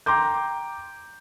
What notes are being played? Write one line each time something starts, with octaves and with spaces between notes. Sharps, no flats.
G5 A#5 C6 D6 G6